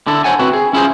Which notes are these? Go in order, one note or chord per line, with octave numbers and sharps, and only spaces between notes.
D3 D4 E4 A4
C5 C#5 F#5 G#5
C4 E4 F#4 B4
G#4
C#4 E4 F4 G#4 C5